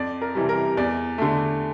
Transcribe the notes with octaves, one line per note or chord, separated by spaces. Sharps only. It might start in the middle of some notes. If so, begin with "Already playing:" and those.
Already playing: F2 D5
A#4
C3 E3 G3
A#4
E2 D5
D3 A3